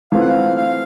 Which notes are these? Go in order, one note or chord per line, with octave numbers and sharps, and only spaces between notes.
E3 A3 C4 F4 F5
F#5
F5
F5